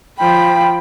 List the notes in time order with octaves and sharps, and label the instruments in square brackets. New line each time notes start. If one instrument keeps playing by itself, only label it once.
[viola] F3 B5 [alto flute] G5